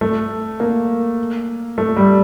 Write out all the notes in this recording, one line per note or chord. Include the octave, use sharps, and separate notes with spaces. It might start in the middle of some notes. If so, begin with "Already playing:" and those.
A3
A#3
A3
G3